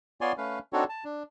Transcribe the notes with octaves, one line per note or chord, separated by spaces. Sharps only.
B3 F4 C#5 D5 G#5 C6
A3 C#4 B4 F5
C4 D4 D#4 F#4 A4 C#5
A5
D4